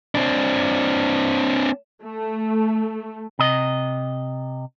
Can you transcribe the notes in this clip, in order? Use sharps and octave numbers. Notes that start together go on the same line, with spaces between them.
C4 D4
A3
C3 D#5